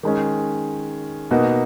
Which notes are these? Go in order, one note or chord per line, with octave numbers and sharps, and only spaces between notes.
D#3 G#3 C#4
B2 A#3 D#4 F#4